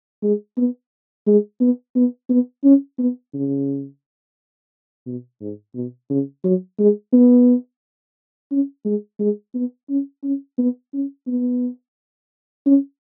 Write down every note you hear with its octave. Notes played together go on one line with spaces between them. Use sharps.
G#3
B3
G#3
B3
B3
B3
C#4
B3
C#3
B2
G#2
B2
C#3
F#3
G#3
B3
C#4
G#3
G#3
B3
C#4
C#4
B3
C#4
B3
C#4